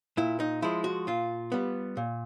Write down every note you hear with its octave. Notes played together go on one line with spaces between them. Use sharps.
A#2 E4
D#4
F3 G#3 E4
F#4
A#2 F4
G3 B3
A#2